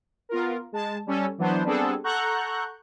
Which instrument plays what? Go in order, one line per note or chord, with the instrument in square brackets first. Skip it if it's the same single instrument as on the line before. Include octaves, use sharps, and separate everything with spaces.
[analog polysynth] B3 F4 A#4
G#3 A5
G3 C#4 A4
E3 F#3 B3 D4 C5
G3 B3 C4 D4 G#4 A4
A4 F#5 A#5 C#6 F#6 G6